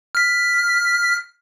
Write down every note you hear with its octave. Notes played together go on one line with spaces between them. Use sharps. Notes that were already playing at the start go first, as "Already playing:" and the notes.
F6 B6